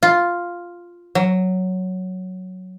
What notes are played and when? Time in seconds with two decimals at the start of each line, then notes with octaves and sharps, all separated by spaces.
0.03 F4
1.15 F#3